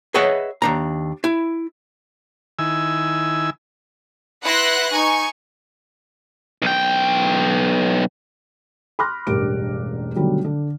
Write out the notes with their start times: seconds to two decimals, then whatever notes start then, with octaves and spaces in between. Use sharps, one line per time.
0.14 G#4 B4 C#5 D#5 E5 F#5
0.62 D#2 D4 A#5
1.24 E4
2.59 D#3 E4 G#5 E6
4.44 E4 B4 F#5 C6 F#6 A#6
4.91 D#4 G#5 C#6
6.62 B1 G5
8.99 B5 C6 D6 F6 F#6 A#6
9.27 E1 A1 G2 G4 A#4 D7
10.16 B2 D3 D#3 F#3 G3 A3
10.45 D3